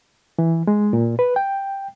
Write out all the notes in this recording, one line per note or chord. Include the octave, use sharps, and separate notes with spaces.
E3
G#3
A#2
B4
G5